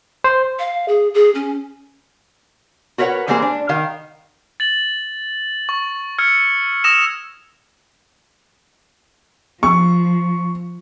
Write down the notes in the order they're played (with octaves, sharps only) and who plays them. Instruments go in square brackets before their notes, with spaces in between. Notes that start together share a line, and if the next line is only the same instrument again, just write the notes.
[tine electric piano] C5
[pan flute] F5
G#4
G#4
C#4
[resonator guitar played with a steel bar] F#4 A#4 B4 C#5 F#5
E3 G3 G#3 A#3 G#4 C5
D4
D#3 A#4 F5
[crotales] A6 F#7
C#6
E6 F6 G#6 C#7
D#6 E6 A#6 E7 F7
[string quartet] F3 [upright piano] C#6